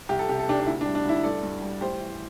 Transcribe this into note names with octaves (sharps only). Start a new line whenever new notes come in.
C2 G4
A4
C3 G4
A4
C3 D4 G4
D4
D2 E4
D4
G3
D4
D2 E4
G2 A4 D5
G2
G3
A2 G4 C5
E3